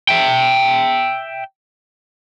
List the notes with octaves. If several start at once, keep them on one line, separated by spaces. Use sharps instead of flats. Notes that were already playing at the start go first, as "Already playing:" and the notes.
E5 G5